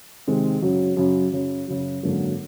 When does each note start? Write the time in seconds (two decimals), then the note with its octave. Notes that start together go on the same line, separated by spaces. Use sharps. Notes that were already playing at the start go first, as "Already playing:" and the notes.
0.27 C3 D#3 G#3 C4
0.62 F#2 C#3 F#3
0.97 F#2 C#3 F#3
1.32 F#2 C#3 F#3
1.68 F#2 C#3 F#3
2.03 G#1 F#2 D3 F#3 A#3